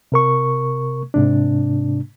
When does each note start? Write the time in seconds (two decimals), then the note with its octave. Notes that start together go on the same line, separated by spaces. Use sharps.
0.12 C3 A#4 C#6
1.14 G#2 C3 D4